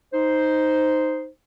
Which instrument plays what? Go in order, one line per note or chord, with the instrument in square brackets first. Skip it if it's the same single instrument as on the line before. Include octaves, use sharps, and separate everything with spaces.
[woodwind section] D#4 C5